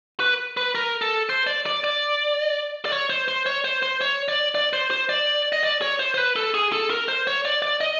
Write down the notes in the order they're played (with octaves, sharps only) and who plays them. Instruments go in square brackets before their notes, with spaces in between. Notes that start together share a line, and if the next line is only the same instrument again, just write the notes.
[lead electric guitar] B4
B4
A#4
A4
C5
D5
D5
D5
D5
C#5
C5
C5
C#5
C5
C5
C#5
D5
D5
C5
C5
D5
D#5
D5
C#5
C5
C5
B4
A4
G#4
A4
A#4
C5
C#5
D5
D5
D#5